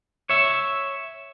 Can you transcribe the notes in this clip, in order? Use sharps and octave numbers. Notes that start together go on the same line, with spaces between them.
C#5 E5